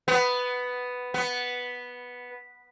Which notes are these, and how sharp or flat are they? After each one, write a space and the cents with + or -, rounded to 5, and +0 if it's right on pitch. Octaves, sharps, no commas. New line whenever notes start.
B3 +5
B3 -5